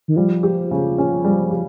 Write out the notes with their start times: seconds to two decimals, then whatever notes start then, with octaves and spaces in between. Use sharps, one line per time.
0.08 D#3
0.16 F3 G3
0.43 G4
0.71 C#3
0.98 C#4
1.24 G3
1.51 G4